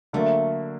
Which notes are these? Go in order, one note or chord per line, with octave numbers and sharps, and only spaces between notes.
D3 F#3 A3 A#3